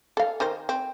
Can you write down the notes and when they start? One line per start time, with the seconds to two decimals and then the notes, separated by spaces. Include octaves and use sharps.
0.17 A4 F5
0.40 D#3 A#4 C5
0.69 C4